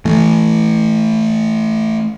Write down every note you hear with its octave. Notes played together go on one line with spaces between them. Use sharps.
E3 A3